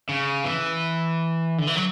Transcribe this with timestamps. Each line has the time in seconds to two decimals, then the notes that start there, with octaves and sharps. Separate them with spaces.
0.09 C#3
0.44 E3
1.58 D3
1.67 E3
1.76 F#3